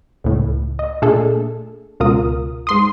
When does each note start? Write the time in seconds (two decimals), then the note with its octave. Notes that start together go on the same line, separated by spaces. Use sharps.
0.24 C#2 A2
0.79 D#5
1.02 A#2 A3 D4 G#4 A4
2.00 C#2 B2 F4 A#4 D#6
2.67 G#2 C6 D#6